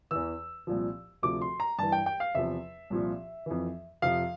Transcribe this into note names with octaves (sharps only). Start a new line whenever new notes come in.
E2 E3 E6
C2 A#2 F3
D2 C3 F3 D6
C6
A#5
G2 E3 A5
G5
G5
F5
E2 C3 F3 E5
C2 A#2 F3
F2 E3
F2 C3 F3 F5